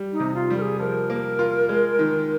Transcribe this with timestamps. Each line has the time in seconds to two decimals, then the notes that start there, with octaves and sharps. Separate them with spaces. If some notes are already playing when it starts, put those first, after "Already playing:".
Already playing: G3
0.12 D#4
0.20 C3
0.34 F4
0.50 G3
0.57 A#4
0.62 G#4
0.79 F3 A#4
1.10 A#3
1.39 F4
1.69 G#3
1.99 D#3